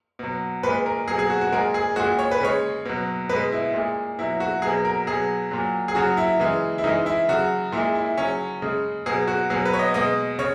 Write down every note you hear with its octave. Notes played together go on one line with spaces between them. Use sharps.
B2 F#3
A#2 G#3 B4
A#4
B2 F#3 G#4
G#4
F#4
F#4
A#2 G#3 A#4
G#4
A#2 G#3 F#4
C#5
B4
C#3 G#3 C#5
B2 F#3
B2 G#3 B4
E4
A#2 G#3
B2 F#3 E4
F#4
B2 F#3 G#4
A#4
B2 F#3 G#4
A#2 F#3
G#4
C#3 F#3 F#4
E4
C#3 E3 G#3
E4
C#3 E3 G#3 D#4
E4
C#3 F#3 F#4
A#2 G#3 E4
E4
C#3 F#3 C#4
C#3 G#3
B2 F#3 G#4
F#4
B2 F#3 G#4
B4
C#5
D#5
B2 G#3 D#5
C#3 C#5